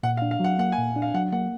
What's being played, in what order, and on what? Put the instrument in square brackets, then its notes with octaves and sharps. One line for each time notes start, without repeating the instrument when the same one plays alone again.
[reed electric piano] A#2 [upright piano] F#5
[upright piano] F5
[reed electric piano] D4
[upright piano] F5
[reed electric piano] F#3 [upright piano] F#5
[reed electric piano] A#3 [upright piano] F#5
[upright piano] G#5
[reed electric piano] A#2
D4
[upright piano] F5
[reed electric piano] F#3 [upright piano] F#5
[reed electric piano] A#3 [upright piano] F#5